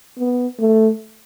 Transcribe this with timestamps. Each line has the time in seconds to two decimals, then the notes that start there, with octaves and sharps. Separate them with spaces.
0.18 B3
0.60 A3